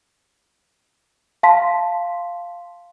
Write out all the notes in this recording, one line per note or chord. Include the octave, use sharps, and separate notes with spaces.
F5 A5 C6 B6